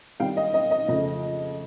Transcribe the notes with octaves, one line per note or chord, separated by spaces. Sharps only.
D#3 G3 C4 D#4 F5 G5
D#5
D#5
D#5
F2 C#3 F3 A3 D#5